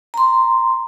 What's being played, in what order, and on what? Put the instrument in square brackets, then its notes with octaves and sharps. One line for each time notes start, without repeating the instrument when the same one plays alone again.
[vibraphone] A#5 C6